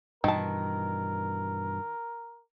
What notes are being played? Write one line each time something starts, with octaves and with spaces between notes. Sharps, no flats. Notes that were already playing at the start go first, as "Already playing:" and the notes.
G2 B2 D#3 E3 A#4 A5